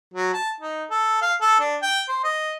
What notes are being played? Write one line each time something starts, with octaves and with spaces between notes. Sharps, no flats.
F#3
A5
D#4
A4
F5
A4
D4
G5
C5
D#5